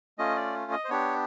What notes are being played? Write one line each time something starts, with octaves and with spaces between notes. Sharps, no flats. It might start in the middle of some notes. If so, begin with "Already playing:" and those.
A3 C#4 F4 D#5
D5
D#5
C5
B3 D4 G4 C#5